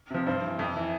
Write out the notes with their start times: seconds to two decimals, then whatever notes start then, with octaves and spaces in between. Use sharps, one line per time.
0.10 C3 F3
0.26 G2 C5
0.43 E3
0.59 F2
0.76 E3